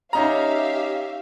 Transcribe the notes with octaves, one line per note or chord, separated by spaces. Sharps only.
C#4 D#4 G4 E5 F5 A#5